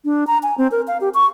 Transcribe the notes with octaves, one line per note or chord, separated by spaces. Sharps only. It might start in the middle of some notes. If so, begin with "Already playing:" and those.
D4
A#5
G#5
C4
A#4
F5
G4
C#6